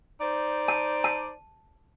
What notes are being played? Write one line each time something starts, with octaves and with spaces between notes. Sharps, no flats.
D#4 C5 D5
A5
A5